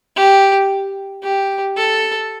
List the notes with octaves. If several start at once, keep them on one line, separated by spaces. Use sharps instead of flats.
G4
G4
A4